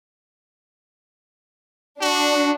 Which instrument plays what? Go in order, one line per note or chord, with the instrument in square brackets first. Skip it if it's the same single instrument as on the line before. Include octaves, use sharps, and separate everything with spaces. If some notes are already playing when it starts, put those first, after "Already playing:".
[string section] D4 [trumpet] F#4